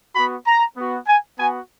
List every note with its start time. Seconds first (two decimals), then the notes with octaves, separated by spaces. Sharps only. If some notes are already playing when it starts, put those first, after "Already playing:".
0.15 B3 F#4 B5
0.46 A#5
0.77 B3 F#4
1.07 G#5
1.38 B3 F#4 G#5